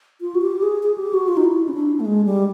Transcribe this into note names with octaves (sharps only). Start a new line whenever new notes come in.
F4
F#4
G4
G#4
G#4
G4
F#4
F4
D#4
E4
C#4
D4
A3
G#3
G3